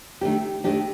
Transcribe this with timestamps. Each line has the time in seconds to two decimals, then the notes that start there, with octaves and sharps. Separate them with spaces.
0.21 D#3 A3 D4 G4
0.64 D#3 A3 D4 G4